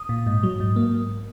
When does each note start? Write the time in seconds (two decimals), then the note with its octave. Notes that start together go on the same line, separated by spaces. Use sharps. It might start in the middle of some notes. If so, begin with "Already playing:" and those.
Already playing: D#6
0.09 A#2
0.27 G#2
0.43 F#3
0.60 G#2
0.76 A#3